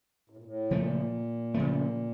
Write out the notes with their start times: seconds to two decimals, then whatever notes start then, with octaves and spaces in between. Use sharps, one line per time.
0.30 A2
0.37 A#2
0.44 A2
0.71 A#2 C#3 F3 A3
1.54 C#3 F3 A3